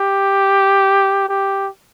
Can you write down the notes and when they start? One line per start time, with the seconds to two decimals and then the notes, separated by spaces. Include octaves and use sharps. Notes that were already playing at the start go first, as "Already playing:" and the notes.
Already playing: G4
1.29 G4